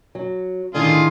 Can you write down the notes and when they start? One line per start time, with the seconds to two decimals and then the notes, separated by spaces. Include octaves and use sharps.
0.15 F#3
0.74 A2 D3 D#3 E4 F4 G#4